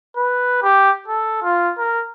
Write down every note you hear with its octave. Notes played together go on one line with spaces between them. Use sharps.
B4
G4
A4
F4
A#4